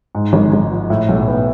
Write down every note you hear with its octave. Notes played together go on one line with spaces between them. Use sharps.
G#2
G#1
G#1
F3
A2
B1
B3